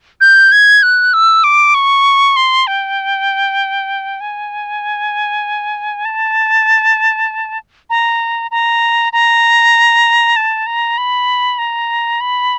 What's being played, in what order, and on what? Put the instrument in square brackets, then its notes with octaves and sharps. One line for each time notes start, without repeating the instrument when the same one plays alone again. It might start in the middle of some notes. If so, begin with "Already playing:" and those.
[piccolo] G6
G#6
F#6
E6
D6
C#6
C6
G5
G#5
A5
A#5
A#5
A#5
A5
A#5
B5
A#5
B5